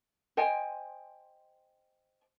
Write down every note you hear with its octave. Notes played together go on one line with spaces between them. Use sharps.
C5 D#5 G5 G#5